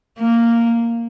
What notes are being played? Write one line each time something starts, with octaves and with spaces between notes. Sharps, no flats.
A#3